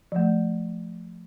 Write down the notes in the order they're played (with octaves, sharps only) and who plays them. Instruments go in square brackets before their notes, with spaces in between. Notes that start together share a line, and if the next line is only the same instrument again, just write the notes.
[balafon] F3 A3